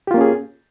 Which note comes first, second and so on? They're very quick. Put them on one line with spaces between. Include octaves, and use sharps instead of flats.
G4 F4 A#3 C#4 G#4